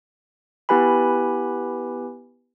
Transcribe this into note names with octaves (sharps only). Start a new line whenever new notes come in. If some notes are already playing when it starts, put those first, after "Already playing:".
B3 E4 G4 B4 G#5 B5